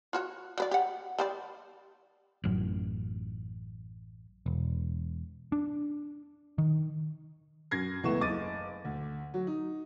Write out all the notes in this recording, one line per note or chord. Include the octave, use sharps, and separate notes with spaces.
F4 F#4 C#5
F#3 B4 D5
G4 F#5
G3 C5 D5
A1 F#2
E1
D4
D#3
F#2 G#6 A#6 C7
C#2 E3 A3 B3 C#6 E7
F#1 D#5 D6 A6 D#7
D2
F#3
D#4